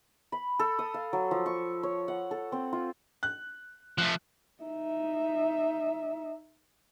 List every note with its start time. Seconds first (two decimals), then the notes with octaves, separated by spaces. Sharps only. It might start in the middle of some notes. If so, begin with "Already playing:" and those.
0.32 B5
0.59 A4
0.79 D#6
0.94 F5
1.13 F#3
1.31 F3
1.46 C#6
1.83 C#5
2.08 F#5
2.31 A4
2.52 C4
2.73 F4
3.23 F#6
3.98 F3 A3 F#6
4.63 D#4 E5